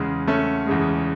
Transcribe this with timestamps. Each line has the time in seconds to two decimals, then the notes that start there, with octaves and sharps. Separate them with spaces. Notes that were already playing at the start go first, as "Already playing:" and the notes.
Already playing: E2 C#3 G#3
0.28 A3 C#4
0.66 E2 C#3 G#3